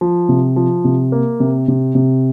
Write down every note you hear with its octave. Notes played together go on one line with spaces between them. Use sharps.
F3
C3
F3
C3
A#3
C3
C3
C3